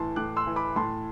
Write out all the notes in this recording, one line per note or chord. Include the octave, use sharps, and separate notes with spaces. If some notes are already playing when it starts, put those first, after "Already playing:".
Already playing: A2 E3 A5 C6
A2 D6 F#6
C6 E6
E3
B5 D6
A2 A5 C6